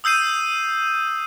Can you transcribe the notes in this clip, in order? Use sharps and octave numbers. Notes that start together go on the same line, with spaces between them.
D#6 E6 G6 C7 D#7